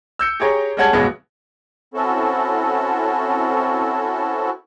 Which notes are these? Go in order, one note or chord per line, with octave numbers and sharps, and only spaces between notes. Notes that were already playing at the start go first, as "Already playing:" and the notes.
E6 G6 C#7
G4 G#4 C#5 A#5
G3 G#3 C#4 F#5 A5 G#6
E2 G2 B2 F#3 G#3 B3
C4 C#4 E4 F#4 A4